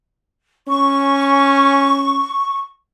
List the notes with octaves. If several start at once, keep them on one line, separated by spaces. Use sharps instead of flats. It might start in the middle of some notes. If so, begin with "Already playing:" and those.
C#4 C#6